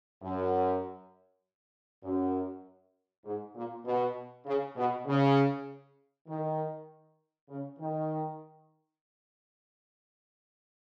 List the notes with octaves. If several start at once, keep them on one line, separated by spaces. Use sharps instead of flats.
F#2
F#2
G#2
A#2
B2
C#3
B2
C#3
D#3
C#3
D#3